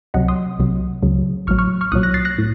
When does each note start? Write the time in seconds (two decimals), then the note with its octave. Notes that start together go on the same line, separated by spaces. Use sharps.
0.14 C#2 C3 F#3 D#5 F#5
0.28 C6 D#6
0.59 C2 C3 F#3
1.03 C#2 C#3 F#3
1.47 A1 A2 F#3 C#6 F6
1.59 C#6 F6
1.81 C#6 F6
1.92 C2 A#2 F#3 D#6 F#6
2.03 F#6 A#6
2.14 A6 C7
2.25 F#6 A#6
2.39 A2